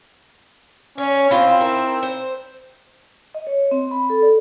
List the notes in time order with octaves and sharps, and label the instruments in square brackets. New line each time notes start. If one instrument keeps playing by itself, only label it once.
[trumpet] C#4 [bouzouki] C#5
[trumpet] C4 [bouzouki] E4 F4 D#5
[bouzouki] D#4 E4 A#4
C5
[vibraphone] D#5
C#5
C4
B5
A4
D5